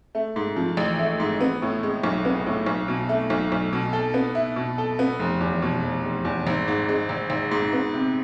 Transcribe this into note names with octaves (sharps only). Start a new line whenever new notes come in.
A3
G#2
F3
A1
A3
G#2
B3
A2
G#3
B1
B3
A2
B1
B2
A3
B1
B1
B2
A4
B3
E4
B2
A4
B3
F1
E2
B2
F1
F1
E2
G#1
G#2
G#3
G#1
G#1
G#2
B3
C3